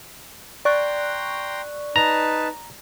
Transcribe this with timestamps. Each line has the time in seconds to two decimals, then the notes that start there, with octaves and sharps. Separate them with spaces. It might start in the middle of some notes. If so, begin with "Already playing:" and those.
0.65 D5 G5 A#5 C6 C#6 F#6
1.96 D#4 B4 A5 A#5